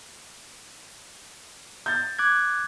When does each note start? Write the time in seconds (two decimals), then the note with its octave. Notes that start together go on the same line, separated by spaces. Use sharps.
1.86 G6 A6
2.19 D6 F#6 G#6